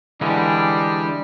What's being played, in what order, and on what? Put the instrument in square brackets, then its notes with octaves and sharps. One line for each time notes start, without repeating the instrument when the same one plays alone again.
[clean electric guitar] D3 E3 G#3 [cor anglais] G3 [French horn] D4